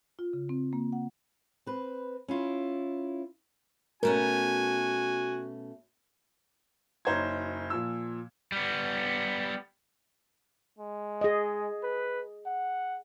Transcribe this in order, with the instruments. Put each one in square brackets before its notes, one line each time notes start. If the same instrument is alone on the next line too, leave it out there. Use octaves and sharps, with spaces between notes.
[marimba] F4
C#3
C4
A#3
F#5
[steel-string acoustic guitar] C4 B4
C#4 E4 F4
[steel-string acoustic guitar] B2 A3 C#4 [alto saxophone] F#4 [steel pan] A#4 [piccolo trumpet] G#5
[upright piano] F#1 D#4 C5 C#5 A#5 G#6
A#2 F3 E6
[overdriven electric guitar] G3 B3
[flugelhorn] G#3
[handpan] G#4 D#5
[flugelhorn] B4
F#5